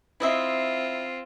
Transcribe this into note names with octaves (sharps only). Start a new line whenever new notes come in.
C4 E4 F4 D#5 E5